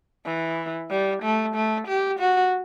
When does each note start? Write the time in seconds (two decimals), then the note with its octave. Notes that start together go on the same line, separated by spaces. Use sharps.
0.25 E3
0.90 G3
1.23 A3
1.55 A3
1.88 G4
2.19 F#4